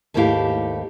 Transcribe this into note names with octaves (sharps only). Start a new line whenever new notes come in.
D#2 G#2 A3 E4 G4 F5